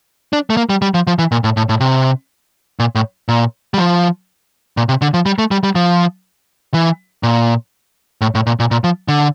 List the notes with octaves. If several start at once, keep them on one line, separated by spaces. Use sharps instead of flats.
D4
A3
A#3
G3
G3
F3
F3
E3
A#2
A2
A2
A2
C3
A#2
A2
A#2
G3
F3
A#2
C3
D3
F3
G3
A3
G3
G3
F3
E3
A#2
A2
A2
A#2
A#2
A#2
F3
D3